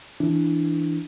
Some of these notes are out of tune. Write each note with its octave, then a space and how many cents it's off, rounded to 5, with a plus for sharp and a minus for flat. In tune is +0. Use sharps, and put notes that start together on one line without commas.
E3 +0 D4 +0